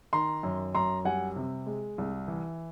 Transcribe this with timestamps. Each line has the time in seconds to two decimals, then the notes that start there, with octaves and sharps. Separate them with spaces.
0.13 D#3 A#5 C6
0.43 F#2
0.75 F#2 A#5 C6
1.05 G3 F#5 G#5
1.36 C3
1.66 G#3
1.98 C2
2.28 E3